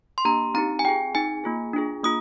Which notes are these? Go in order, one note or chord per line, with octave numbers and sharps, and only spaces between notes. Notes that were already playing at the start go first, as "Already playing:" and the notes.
C6
A#3 D4 G4 A#5
C4 D#4 G4 A#5
G#5
C4 F4 G#4 G5
C4 D#4 G#4 G#5
A#3 F4 G#4
D4 F4 G#4
A#3 F4 D#6